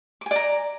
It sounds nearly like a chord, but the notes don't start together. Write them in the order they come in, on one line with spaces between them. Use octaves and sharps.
D6 G#5 D5 A#5